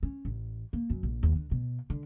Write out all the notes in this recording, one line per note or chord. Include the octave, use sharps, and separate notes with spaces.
C#4
A1
A#3
F#2
A#1
D#2
D3
B2
D3